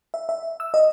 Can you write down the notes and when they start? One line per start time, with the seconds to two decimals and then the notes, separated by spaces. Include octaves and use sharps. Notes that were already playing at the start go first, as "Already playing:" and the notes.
0.14 E5
0.29 E5
0.60 E6
0.74 D#5